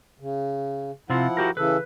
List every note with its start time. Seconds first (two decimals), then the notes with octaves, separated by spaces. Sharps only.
0.20 C#3
1.10 C3 F3 C4 E4 F4 F#5
1.37 F#4 G4 A#4
1.57 C#3 E3 A4 B4